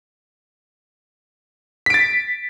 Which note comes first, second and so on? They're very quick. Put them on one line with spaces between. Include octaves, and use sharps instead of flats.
B6 D7 A6